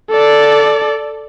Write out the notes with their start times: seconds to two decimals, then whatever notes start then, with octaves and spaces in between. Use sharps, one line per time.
0.11 A4 D5